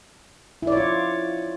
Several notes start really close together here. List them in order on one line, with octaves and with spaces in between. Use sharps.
E4 D5 C#5 F4